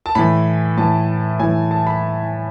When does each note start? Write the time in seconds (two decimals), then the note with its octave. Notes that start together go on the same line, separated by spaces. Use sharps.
0.06 A5
0.15 A2 E3 B5
0.77 A2 E3 A5
1.39 A2 E3 G#5
1.71 A5
1.87 B5